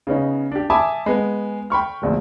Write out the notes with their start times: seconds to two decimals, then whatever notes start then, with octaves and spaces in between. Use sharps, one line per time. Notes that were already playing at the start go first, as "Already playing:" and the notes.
0.07 C#3 B3 C#4 D#4
0.52 D4 G4
0.70 E5 G#5 A5 B5 D6 D#6
1.06 G#3 B3
1.70 G5 B5 C#6 F6
2.02 D1 A#1 E2